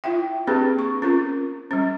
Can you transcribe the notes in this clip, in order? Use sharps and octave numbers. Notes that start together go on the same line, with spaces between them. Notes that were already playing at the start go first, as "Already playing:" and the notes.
E4 F4 E5 G5
A#3 C4 D4 G4 G#4 B4
C#6
C#4 F4 A#4
G3 C#4